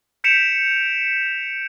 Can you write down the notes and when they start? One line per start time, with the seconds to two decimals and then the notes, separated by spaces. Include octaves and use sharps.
0.24 G6 B6 C#7 D7 E7 F7